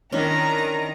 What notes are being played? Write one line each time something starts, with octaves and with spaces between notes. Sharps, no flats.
D#3 C#4 D4 E4 A#5